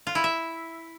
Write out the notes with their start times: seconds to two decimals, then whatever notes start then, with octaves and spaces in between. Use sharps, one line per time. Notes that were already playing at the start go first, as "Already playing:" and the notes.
0.07 F4
0.15 E4
0.24 E5